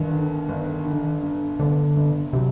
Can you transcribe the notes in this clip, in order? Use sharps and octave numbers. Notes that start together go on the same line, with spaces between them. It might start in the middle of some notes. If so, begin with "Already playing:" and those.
Already playing: G1 G2 D#3
D3
G1
D3
G2
G1 D3
G1
C3 F#3